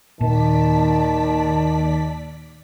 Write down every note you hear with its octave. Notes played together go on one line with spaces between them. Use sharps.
D#2 A#2 D#3 D5 A5 B6